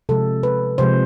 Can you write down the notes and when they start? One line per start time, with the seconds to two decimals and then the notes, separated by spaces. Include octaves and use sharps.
0.09 C3 F3 G#3 A4
0.43 B4
0.78 C3 F3 G#3 C5